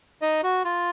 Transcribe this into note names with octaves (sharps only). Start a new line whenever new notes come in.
D#4 D#5
F#4
F4